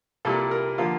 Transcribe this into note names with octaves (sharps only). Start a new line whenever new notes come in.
C2 A#2 G3 A#3 A4
A#4
D3 F3 A#3 F4